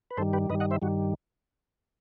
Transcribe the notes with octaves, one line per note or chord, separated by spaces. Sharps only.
B4
G2 D#3 G3 A4 C5
G4 B4
G2 D#3 G3 B4 D#5
D#5 F#5
C5 E5
G2 D#3 G3 F#4